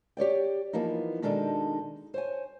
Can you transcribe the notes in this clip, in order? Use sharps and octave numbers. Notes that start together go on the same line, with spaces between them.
G4 C#5 D5 G5
E3 F3 A#3 B3 D#4
B2 D#3 G#3 D4 D#4 A4
C5 C#5 G#5